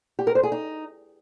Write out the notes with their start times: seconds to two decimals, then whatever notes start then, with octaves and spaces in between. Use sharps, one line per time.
0.19 G4
0.27 A#4
0.35 C5
0.43 G#4
0.52 D#4